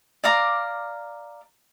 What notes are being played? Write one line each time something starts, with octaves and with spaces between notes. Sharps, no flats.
D5 F5 A#5 D6